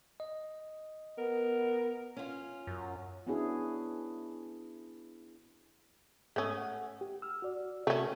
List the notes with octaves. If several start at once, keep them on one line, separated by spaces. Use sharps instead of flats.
D#5
B3 A#4
C#4 F4
F#2
B3 C#4 D4 E4 F#4 G#4
G#2 A3 C#4 D#6
F#5
G4
E6 F6
F#4 D5
C3 A3 C#4 F#4